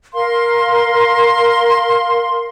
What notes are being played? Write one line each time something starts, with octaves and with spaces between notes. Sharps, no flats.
A#4 F5 C6